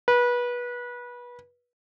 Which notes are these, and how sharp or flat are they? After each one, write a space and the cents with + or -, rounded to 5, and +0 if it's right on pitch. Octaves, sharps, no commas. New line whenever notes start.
B4 -25